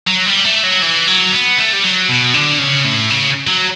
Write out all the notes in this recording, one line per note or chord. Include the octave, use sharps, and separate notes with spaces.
F#3
G3
A3
F#3
E3
F#3
B3
A3
G3
F#3
B2
D3
C#3
A2
C#3
F#3